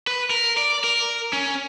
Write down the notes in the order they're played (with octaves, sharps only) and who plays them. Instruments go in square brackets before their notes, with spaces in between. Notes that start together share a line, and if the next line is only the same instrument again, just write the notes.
[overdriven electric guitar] B4
A#4
D5
A#4
C#4